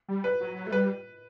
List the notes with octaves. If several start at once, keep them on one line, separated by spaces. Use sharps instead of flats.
G3
B4
F#3
F#3
A3
G3 B4